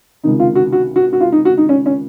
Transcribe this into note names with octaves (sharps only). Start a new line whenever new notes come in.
C#2 C3 D#3 D#4
F4
F#4
F#4
F#4
F#4
F4
D#4
F#4
D#4
C#4
C#4